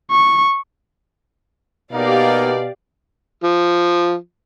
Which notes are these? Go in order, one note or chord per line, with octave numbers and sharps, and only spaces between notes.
C#6
B2 A#3 B3 D#4 G4 A#4 D5 F5
F3